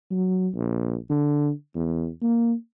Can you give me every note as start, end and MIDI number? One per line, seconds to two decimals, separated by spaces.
0.11 0.49 54
0.55 0.95 34
1.10 1.50 50
1.75 2.08 40
2.22 2.54 58